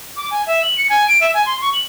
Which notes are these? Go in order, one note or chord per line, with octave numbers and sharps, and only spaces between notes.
D6
G#5
E5
F#7
C#7
G#5
D7
E5
G#5
C6
C#6
F#7